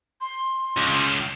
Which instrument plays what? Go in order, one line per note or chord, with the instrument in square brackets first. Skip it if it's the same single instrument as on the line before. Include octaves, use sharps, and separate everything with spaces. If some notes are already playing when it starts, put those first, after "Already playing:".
[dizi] C6
[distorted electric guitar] C#2